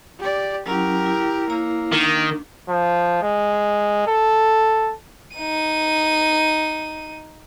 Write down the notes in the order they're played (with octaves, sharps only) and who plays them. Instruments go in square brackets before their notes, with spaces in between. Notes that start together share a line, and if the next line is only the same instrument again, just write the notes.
[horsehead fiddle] G4 D5
[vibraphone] F#3 C#4 E4 [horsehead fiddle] G4 A#4
[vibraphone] E4
[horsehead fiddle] A#3 [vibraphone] E4 C#5 A#5
[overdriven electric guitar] D#3 [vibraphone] D4
[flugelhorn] F3
G#3
A4
[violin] D#4 D#7